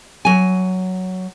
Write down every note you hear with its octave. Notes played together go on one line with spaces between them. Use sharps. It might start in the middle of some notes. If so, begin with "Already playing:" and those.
F#3 G#5